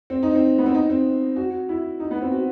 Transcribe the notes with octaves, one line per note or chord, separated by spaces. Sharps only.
C4
D#4
C4
B3
C4
D#4
C4
F#4
E4
D#4
B3
C4
F#4